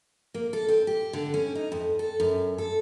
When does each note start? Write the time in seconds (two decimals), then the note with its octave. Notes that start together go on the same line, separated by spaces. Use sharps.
0.34 A#3
0.53 A4
0.69 C4
0.87 G4
1.13 D3
1.34 C#4
1.55 D#4
1.72 F2
1.99 A4
2.20 F#2
2.58 A4